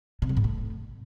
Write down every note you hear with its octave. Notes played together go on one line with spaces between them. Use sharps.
C3
F#3
G#2
A3